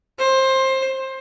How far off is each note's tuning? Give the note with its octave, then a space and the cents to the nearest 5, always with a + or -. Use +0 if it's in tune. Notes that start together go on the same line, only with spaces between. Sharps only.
C5 +20